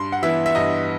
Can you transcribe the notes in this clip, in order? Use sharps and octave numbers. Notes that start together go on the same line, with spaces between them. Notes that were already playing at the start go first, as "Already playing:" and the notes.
Already playing: G2 C6
F#5
E3 B3 E4 E5
E5
G2 D#5